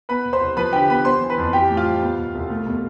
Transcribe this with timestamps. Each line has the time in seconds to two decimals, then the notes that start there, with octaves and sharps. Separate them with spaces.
0.09 B3 B4 B5
0.25 B2
0.33 C5 C6
0.41 C2
0.57 F3 B4 B5
0.73 D3 G4 G5
0.90 B3 B4 B5
1.05 B3 C5 C6
1.21 E3
1.30 B4 B5
1.38 F2
1.53 E3 G4 G5
1.70 A2
1.77 F4 F5
1.86 G3
2.02 B3
2.19 B2
2.35 C2
2.50 A3
2.66 B2